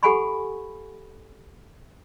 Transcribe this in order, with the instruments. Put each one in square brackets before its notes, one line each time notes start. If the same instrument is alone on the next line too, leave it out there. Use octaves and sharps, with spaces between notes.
[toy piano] G4 A4 F#5 G#5 B5 C#6